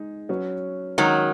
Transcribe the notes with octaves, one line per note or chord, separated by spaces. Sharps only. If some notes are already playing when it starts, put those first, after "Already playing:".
Already playing: G#3 D#4 G#4
F#3 C#4 F#4 B4
D#3 F#3 G#3 C#4 F#4 C#5